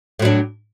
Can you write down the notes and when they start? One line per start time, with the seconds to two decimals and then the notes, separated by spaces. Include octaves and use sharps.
0.19 A2
0.22 F#3
0.25 D4